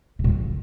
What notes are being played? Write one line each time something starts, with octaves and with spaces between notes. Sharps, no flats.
C3
A#2
F2